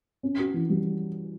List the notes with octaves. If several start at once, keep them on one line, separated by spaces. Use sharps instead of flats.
C#4
F#4
E3
G3